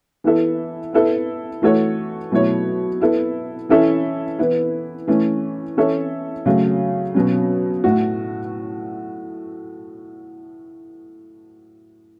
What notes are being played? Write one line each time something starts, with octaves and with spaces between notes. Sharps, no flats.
E3 B3 E4 A4 E5
B3 E4 A4 E5
E3 A3 F#4 A4 C#5
B2 F#3 A3 E4 C#5
B3 E4 A4
E3 C#4 E4 A4 E5
E3 B3 E4
E3 A3 C#4
E3 C#4 A4 C#5 E5
C#3 F#3 A3
B2 F#3 C#4
A2 A3 F#4